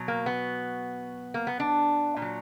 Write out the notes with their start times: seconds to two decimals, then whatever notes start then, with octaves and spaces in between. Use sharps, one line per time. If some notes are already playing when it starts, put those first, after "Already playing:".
Already playing: B2 F#3
0.08 A#3
0.26 B3
1.34 A#3
1.47 B3
1.60 D4
2.17 A#2
2.22 F#3